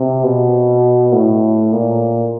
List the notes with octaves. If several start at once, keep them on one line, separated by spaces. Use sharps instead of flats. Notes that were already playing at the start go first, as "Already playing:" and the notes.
Already playing: C3
B2
A2
A#2